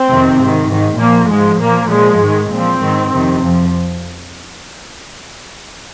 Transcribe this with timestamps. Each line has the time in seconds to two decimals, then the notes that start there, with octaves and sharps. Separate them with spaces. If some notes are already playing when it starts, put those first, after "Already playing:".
Already playing: C4
0.09 F2 C3 D#3
0.39 G#2 D#3
0.69 G#2 D#3
0.99 A#2 F3 A#3
1.29 G#2 F3 G#3
1.60 A#2 F3 A#3
1.90 A#2 F3 G#3
2.21 G#2 D#3
2.51 A#2 F3 C4
2.82 G#2 D#3
3.12 F2 C3 D#3
3.42 F2 F3